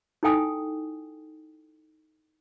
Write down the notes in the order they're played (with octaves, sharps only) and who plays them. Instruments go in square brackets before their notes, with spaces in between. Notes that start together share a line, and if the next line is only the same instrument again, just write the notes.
[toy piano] D#4 E4 A4 G5 G#5 D#6